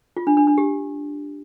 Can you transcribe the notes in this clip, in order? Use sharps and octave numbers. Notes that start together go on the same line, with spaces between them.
F4
D4
D4
D4
G4